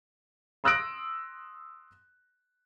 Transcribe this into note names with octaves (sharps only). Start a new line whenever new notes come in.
C6 D#6 E6 F#6 A#6 D7